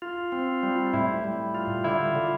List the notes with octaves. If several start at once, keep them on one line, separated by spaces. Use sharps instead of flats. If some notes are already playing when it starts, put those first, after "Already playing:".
F4
C4
G3
A2 E4
G3
F4
D3 E4
D3